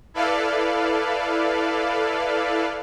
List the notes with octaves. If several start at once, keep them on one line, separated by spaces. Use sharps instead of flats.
E4 A4 B4 D5 F5